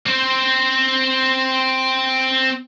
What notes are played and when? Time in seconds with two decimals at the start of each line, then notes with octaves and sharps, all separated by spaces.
0.06 C4 C5